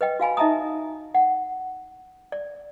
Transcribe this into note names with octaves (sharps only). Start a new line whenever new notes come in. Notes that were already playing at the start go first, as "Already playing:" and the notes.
B4 D#5 G5
F#4 F5 G#5 B5
D#4 D#5 E5 A5 A#5 D#6
F#5
D5